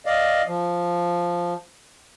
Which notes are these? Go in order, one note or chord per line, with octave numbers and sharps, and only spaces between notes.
D5 D#5 F5
F3